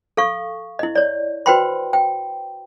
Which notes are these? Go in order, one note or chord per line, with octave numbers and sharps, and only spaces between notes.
A4 F5 C#6
E4 D#5
C#5 D5
F#4 B4 C5 G5 B5 C6
G5